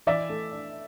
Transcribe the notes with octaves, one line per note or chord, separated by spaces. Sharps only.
E3 D5 E5
A3
D4